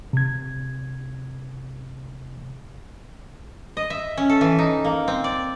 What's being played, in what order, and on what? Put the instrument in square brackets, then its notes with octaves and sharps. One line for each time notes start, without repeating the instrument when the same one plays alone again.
[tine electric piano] C3 G#6
[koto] D#5
E5
C#4
A4
E3
D#4
A#3
C4
D5